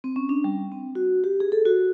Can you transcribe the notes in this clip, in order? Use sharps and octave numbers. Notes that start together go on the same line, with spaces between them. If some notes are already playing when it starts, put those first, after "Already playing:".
C4
C#4
D4
G3
C4
F#4
G4
G#4
A4
F#4